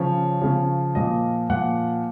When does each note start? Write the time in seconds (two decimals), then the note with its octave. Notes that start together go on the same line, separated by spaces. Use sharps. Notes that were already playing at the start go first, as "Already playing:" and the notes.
Already playing: C#3 F3 C#5
0.41 C#3 F3
0.95 A#2 F3 D#5
1.50 A#2 F3 F#5